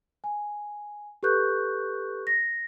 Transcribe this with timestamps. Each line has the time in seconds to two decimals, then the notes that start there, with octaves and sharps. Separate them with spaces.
0.24 G#5
1.23 G4 A4 B4 C#6 F#6 G6
2.27 A#6